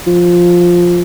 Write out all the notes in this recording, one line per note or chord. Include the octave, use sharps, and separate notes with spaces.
F3